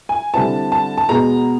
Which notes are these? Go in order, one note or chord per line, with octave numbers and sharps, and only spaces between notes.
G#5
D3 G3 C4 E4 A5
A5
A5
B2 G#3 B3 A#5